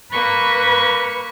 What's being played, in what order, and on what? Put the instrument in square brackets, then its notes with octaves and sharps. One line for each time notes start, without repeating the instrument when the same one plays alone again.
[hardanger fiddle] A#3 C#6 [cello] B4